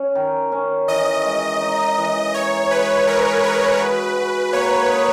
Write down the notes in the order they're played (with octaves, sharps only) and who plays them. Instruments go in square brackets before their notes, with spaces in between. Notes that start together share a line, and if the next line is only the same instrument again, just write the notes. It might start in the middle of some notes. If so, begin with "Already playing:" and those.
Already playing: [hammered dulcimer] C#4
D#3
C#4
[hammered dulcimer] E3 [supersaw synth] D#5
[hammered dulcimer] G#3
D#4
E3
[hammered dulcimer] D#4 [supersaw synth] C#5
[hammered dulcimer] G#3 [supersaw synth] B4
[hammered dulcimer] G#4 [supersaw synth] A#4
[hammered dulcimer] G#4 [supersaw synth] B4
[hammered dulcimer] F#4
F#4
[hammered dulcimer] A#3 [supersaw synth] C#5
[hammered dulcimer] D#4